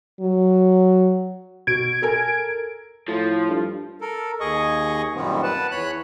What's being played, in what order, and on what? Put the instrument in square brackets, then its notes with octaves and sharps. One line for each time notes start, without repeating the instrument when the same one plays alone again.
[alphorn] F#3
[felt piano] B2 [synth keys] G#6 D7
[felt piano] A4 A#4 G#5
[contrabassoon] A2 [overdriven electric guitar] F3
[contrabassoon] G2
[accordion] A4 A#4
D#2 G#4 D#5 C#6
F#2 A#2 D#3 G3 B3 C4
B4 F#5 A5
E2 C#5 B5 F#6